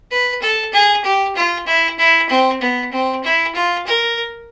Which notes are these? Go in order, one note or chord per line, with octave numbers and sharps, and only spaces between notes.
B4
A4
G#4
G4
F4
E4
E4
C4
B3
C4
E4
F4
A#4